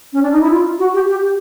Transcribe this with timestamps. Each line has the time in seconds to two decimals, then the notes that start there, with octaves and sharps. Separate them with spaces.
0.13 C#4
0.23 D4
0.32 D#4
0.41 E4
0.51 F4
0.79 F#4
0.94 G4
1.09 G4